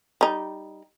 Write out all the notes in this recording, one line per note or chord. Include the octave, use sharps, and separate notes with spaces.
G3 D#4